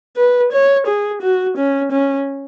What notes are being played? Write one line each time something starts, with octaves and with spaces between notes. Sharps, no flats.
B4
C#5
G#4
F#4
C#4
C#4